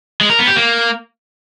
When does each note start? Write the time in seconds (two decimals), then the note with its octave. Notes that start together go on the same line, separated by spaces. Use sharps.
0.21 G#3
0.30 A#4
0.39 B3
0.47 G4
0.56 A#3